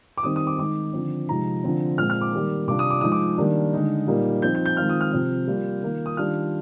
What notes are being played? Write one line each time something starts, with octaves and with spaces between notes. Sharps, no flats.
D6
D#3 G3 C4 D#4 D#6
D#6
D6
D#3 G#3 D#4 D6
D3 F3 C4
C3 F3 G#3 D#4 A#5
D3 F3 C4
A#2 G#3 C4 F6
F6
D6
D#3 G3 A#3
C3 G3 D4 F4 D6
D#6
D6
F3 G#3 D#4 D#6
D6
D#3 G3 A#3 D4
D3 G#3 D#4
A#2 G3 A#3 D#4
F3 C4 D#4 G6
G6
G6
D#3 G#3 C4 F4 F6
D#6
F6
C3 F3 C4 F4
G3 A#3 F4
D#3 A#3 F4
D#6
D#3 G3 D4 F4 F6